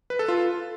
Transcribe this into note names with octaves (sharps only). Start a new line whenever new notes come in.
B4
A4
F4